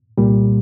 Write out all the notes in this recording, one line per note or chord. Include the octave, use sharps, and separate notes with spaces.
C2 A#2 G3